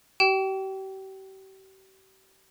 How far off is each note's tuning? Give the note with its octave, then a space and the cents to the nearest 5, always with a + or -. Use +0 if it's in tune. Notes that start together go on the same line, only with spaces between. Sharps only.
G4 -40 G5 -25